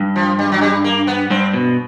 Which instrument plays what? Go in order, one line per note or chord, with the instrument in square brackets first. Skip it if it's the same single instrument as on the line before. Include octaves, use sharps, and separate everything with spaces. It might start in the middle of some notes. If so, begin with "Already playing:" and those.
Already playing: [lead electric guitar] G2
[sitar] F3
G3
F#3
G3
A#3
B3
[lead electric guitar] G2 [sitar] C4
[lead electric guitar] B2